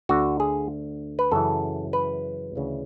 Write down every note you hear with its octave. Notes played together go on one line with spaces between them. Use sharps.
D2 D3 F#4
G#4
B4
F#2 C#3 E3 A4
B4
D2 C#3 E3